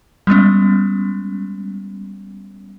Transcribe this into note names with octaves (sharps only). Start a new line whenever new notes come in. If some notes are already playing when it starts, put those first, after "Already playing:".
G3 G#3 B3 C#4